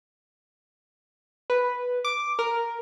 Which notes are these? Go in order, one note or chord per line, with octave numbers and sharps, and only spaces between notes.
B4
D6
A#4